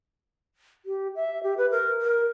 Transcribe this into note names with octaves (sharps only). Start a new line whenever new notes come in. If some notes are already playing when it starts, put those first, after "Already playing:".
G4
E5
G4
B4
A#4
A#4